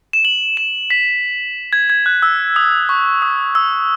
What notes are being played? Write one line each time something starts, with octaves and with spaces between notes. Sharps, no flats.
E7
F#7
E7
B6
G#6
G#6
F#6
E6
D#6
C#6
D#6
E6